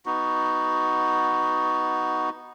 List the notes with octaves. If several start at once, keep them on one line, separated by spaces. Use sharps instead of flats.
B3 D#4 F#4